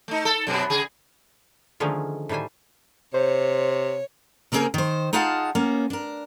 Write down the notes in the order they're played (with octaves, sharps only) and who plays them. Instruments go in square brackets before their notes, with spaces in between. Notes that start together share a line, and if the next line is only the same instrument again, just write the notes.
[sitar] A3 D#4
A4
F#2 B2 B3
C#3 G#4
[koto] D3 D#3 F3 G#3 A3 C#4
A2 D#3 G3 C5 G#5
[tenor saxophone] C3 [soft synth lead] C5 [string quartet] C#5
[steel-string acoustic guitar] C#3 A#3 C4 D#4 G#4 A#4
D#3 C5
D#4 F4 G#4 F5 F#5 A5
A#3 B3 C#4
D4 A#4